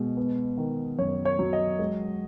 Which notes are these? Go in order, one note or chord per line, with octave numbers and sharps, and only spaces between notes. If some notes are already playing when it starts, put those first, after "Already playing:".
Already playing: B2 G#3
B3
D#3
F#2 C#5
C#5
F#3
D#5
G#3